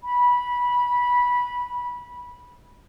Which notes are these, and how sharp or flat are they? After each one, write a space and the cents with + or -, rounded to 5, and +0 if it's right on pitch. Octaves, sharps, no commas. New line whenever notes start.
B5 -15